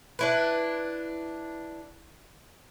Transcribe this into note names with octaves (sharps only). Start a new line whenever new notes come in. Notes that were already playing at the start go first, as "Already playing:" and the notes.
D4 E4 B4